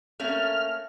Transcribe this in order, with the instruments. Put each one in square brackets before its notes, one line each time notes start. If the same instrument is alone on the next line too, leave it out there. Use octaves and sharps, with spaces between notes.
[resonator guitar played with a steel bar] A3 A#3 C#4 [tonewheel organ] F6